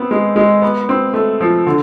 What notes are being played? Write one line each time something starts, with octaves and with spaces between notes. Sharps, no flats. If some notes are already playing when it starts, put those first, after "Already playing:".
Already playing: B3 C4
G#3
G#3
B3
C4
A3
F3
D3